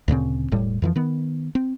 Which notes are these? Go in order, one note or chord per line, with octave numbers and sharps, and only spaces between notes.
D2 A#2 C#3 C4
E1 A2 G3
F2 E3 F3
D#3 B3
C4